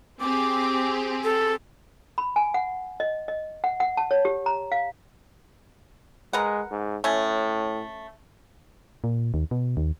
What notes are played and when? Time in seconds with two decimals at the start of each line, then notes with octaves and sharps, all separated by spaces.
0.20 C4 G4 G#4 D6
1.24 A4
2.18 B5
2.36 G#5
2.54 F#5
3.00 D#5
3.28 D#5
3.64 F#5
3.80 F#5
3.97 A5
4.11 C#5
4.25 G4
4.46 A#5
4.72 F5
6.33 G#3 A#4 B4 F#5
6.71 G#2
7.04 A2 A3 C#4
9.04 A#2
9.34 D#2
9.51 B2
9.77 D#2